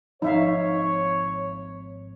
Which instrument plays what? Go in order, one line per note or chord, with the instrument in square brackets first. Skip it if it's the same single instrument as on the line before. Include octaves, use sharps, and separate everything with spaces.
[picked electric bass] G#1 F3 [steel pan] D#4 E5 F5 [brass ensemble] C#5